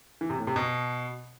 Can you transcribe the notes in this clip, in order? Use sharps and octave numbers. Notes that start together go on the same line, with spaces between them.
E3
C3
A2
C3
B2